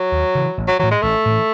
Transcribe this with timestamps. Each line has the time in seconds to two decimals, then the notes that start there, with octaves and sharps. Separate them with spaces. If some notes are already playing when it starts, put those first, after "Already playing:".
Already playing: F#3
0.12 D#2
0.35 C#3 E3
0.58 A1
0.68 F#3
0.79 A2 E3 F#3
0.91 G#3
1.02 A1 A3
1.26 A2 E3